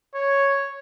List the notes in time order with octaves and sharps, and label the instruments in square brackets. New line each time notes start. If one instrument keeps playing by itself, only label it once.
[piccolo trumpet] C#5